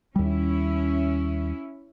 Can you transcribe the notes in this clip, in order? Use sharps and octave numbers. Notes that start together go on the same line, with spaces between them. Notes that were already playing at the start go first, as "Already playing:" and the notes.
D#2 G3 C#4 E4